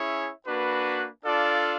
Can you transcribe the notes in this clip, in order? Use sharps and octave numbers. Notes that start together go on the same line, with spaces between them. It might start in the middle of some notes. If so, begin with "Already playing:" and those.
Already playing: C#4 E4 G#4 C#5 E5
A#3 D4 F#4 B4
D4 F4 A4 D5 F5